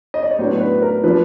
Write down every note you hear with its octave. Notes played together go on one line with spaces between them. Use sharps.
D#5
D5
C#5
A2 F#3 B3 D4 C5
B4
A#4
F3 A#3 D4 B4